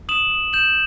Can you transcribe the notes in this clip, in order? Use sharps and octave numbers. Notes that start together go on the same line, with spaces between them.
D#6 E7 F#7
D#6
G6 E7 F#7